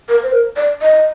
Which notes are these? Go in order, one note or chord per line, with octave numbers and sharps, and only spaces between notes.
A#4
C5
A#4
D5
D#5